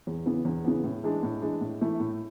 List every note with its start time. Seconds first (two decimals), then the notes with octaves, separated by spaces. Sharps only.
0.07 E2
0.26 C#3 E3 B3
0.45 E2
0.64 C#3 E3 B3
0.84 A2
1.04 E3 G#3 D4
1.23 A2
1.42 E3 G#3 D4
1.61 A2
1.81 E3 A3 E4
2.00 A2